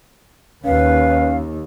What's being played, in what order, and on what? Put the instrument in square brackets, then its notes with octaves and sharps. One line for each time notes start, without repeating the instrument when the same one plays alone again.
[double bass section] D#2 [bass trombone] C#4 [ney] B4 [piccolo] F5